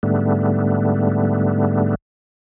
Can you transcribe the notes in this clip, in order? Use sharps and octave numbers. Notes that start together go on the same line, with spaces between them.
G#2 D3 G3 A3 B3